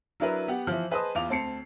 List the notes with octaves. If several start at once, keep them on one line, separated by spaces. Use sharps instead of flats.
F#3 D4 E4 A#4 B4
B3 G4 F#5
E3 F3
G#4 B4 C5 D#5 A5 D#6
E2 B3 F4 D6 F7
D2 C4 A5 C7 C#7